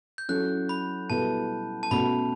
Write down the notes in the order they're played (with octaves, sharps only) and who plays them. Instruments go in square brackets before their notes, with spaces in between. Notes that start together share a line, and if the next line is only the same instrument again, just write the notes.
[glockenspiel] G6
[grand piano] F#3 C#4 E4 A4 [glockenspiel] F#6
[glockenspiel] B5
[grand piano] B2 G3 B3 E4 A4 [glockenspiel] A5
[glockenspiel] A5
[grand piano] B2 A3 C#4 [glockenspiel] B5